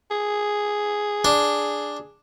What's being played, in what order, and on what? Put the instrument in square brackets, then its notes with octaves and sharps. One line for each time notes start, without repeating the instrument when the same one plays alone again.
[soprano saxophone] G#4
[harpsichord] D4